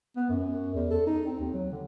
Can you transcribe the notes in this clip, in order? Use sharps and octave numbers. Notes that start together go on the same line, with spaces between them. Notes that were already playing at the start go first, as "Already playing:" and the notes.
B3
F#2
E2
A4
D#4
C4
D#2
F#3
D3